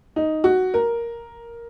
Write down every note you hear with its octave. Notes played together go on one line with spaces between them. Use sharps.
D#4
F#4
A#4